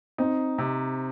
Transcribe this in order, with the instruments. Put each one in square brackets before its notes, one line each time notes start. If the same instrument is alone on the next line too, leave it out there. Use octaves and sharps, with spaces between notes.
[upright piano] C4 [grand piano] D#4
[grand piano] C3